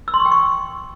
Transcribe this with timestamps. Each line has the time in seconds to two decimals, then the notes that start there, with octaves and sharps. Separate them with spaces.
0.08 E6
0.14 C6
0.20 C#6
0.26 G5
0.32 C#6